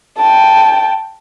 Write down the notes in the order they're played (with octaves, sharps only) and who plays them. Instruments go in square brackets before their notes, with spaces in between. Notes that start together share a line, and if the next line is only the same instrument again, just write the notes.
[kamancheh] G5 A5